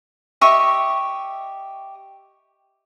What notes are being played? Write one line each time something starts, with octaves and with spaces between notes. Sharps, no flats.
G4 D#5 E5 C#6